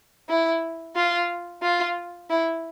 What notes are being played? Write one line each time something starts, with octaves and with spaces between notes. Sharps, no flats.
E4
F4
F4
E4